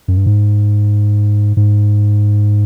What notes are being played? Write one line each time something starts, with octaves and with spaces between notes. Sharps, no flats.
F#2
G2
G#2
G#2